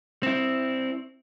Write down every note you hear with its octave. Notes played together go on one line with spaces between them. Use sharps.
C4 E4